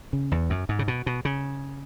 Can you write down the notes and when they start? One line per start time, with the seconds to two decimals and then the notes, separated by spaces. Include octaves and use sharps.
0.13 C#3
0.32 E2
0.50 F#2
0.69 G#2
0.79 C#3
0.88 B2
1.06 B2
1.25 C#3